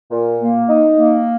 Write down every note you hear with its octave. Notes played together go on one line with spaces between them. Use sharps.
A#2
A#3
D#4
A#3